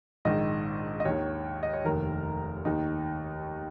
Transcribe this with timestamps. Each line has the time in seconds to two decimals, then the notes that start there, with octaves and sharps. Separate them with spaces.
0.25 A#1 G#2 D#3 D#5
1.00 D#5
1.05 D#2 D#3 C#5
1.63 D#5
1.73 C#5
1.85 F1 D#2 D#3 A#4
2.65 D#2 D#3 D#4